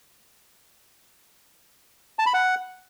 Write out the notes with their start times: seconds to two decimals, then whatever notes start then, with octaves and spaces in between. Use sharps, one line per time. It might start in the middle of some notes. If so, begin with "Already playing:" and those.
2.19 A5
2.26 B5
2.34 F#5